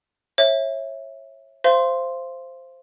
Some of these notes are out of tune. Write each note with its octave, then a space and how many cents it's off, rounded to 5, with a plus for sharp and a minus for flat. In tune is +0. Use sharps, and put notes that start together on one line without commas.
C#5 -25 E5 +0
C5 +0 F5 -30 C6 +0